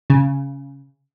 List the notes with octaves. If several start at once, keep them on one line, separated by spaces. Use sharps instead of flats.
C#3